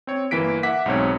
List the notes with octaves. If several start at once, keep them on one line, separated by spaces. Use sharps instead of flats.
C4 C#5
G1 E3 A#3 B6 D7
E5 F#5 D6 B6
B1 G#2 C4 C#5